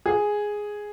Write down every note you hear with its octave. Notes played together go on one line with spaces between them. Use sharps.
G#4